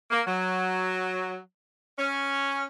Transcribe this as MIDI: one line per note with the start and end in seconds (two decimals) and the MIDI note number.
0.10 0.21 58
0.27 1.38 54
1.98 2.67 61